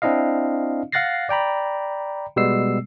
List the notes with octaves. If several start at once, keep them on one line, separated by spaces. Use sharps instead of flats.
C4 D4 E4 D#5 F5
F5 F#5 F#6 A6 A#6 C7
D5 G5 A#5 B5
B2 G3 G#3 B3 E6 C7